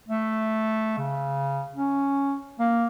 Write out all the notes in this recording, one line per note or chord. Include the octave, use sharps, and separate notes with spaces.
A3
C#3
C#4
A#3